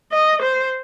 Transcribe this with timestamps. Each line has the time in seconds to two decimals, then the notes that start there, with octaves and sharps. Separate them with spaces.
0.12 D#5
0.42 C5